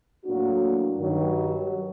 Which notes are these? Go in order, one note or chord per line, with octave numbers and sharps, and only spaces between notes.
A2 F#3 A#3 D4 F#4
G2 D#3 F#3